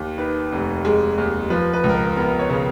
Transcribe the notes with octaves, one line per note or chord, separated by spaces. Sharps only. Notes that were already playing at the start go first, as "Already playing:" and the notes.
Already playing: D#2
D#3 B4
F1
G#3
D#2
F3 B4
B4
C#2
A#4
B4
B3 A#4
C#5
C#3